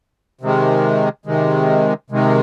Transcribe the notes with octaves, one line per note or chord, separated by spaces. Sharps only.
C3 D#3 G#3
C3 D#3 G#3
C3 D#3 G#3